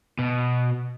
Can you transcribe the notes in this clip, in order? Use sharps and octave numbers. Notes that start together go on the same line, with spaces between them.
B2